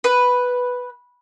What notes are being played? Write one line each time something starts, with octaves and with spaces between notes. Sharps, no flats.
B4